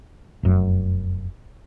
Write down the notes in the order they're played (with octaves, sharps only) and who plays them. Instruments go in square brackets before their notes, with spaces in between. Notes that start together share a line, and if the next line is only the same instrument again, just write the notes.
[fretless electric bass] F1 F#2